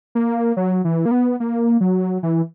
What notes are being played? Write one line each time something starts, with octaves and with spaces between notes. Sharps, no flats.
A#3
F#3
E3
A#3
B3
A#3
F#3
E3